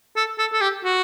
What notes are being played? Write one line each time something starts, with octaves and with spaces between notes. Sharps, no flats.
A4
A4
A4
G4
F#4